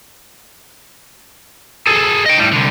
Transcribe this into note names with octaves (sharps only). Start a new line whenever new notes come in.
G#4 A4
D#5 G5
A2 G3
C2 D3